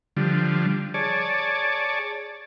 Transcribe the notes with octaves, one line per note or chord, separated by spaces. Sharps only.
D3 F3 G3
G#4 C#5 D5 A5